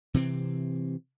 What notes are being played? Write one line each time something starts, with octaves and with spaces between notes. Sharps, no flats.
C3 E3 C4